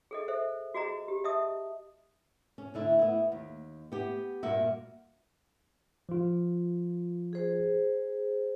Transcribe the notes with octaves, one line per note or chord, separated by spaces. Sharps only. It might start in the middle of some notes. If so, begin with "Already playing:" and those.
G#4 A4 D#5
A4 C5 E5
F#4 G#4 D#5 A#5
G4
D#5 E5 A5 D#6
C#4
D2 D3 E4
B3 E4
D#2
B3 G4
G2 A#2 A#3 F#4 E5
F3 F4
G#4 C5